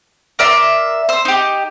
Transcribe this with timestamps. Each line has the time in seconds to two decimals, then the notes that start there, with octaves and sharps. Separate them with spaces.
0.39 A#4 D5 E5 C6
1.09 C5 E6
1.25 D#4 G4